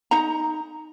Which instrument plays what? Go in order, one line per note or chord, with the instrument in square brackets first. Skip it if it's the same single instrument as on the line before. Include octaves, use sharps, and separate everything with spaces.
[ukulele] D#4 A#5